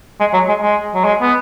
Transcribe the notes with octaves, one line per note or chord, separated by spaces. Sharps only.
G#3
F#3
G#3
G#3
F#3
G#3
B3